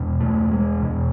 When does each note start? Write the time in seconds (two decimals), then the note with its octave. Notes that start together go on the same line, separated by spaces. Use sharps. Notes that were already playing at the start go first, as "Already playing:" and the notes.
Already playing: E2 B2
0.20 A3
0.52 G#3
0.82 E2 B2